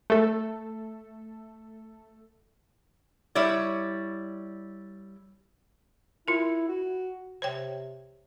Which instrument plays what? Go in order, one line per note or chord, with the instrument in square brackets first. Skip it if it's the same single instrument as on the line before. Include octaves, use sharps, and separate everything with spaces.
[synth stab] A3 A4
[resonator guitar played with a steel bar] G3 E4 C#5 D5
[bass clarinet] E4 [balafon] F4 A#4
[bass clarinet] F#4
[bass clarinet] C3 [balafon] C5 C#5 G5